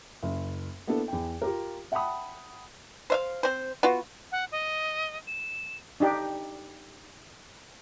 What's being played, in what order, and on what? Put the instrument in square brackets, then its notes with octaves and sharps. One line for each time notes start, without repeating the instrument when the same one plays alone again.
[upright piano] F#1
A#3 B3 D4 E4 A4
E2 G5
F4 G4 A#4
E5 F#5 G5 A5 B5 D#6
[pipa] C5 E5 F5
C4 C5
B3 F4 F#4
[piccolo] F#5
D#5
E7
[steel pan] D4 D#4 G4